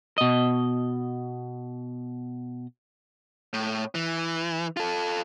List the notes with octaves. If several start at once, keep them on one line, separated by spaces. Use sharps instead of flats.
B2 D#5
A2
E3
F4 A4